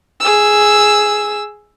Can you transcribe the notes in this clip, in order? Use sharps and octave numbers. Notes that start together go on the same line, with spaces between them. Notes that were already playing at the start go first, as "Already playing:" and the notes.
G#4 E6